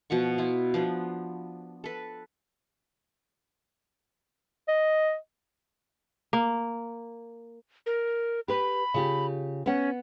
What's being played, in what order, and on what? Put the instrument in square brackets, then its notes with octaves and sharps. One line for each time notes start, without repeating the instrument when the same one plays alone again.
[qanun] B2 F3 F#5 C#6
E4 F4
F3 B3 D4
A4 B4
[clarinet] D#5
[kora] A#3
[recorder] A#4
[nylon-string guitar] G4 B4 [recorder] B5
[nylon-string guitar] C#3 F4 G4
[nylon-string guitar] B3 F#5 [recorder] C#4